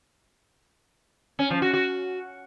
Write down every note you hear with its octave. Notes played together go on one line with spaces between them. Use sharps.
C#4
F3
F#4
F#4